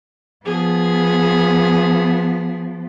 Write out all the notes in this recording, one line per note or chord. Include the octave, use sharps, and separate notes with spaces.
F3 B3 G#4